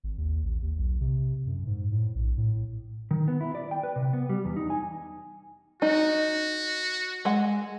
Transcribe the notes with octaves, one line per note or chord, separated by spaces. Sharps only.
G#1
D#2
A1
D#2
B1
C3
F#2
G#2
A2
A#1
A2
D#3
B3
E4
D5
G5
B4
C3
B3
G3
E2
D#4
G#5
D#4 F#4
G#3 F#5